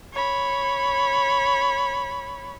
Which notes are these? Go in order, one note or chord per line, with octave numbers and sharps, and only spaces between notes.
C#5 B5